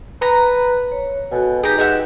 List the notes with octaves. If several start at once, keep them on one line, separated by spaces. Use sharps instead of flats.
B4 A#5
C#5
B2 F#4 A4 G#5
D#4 G4 G#4 B4 A#5
G#3 G4 E5 F#5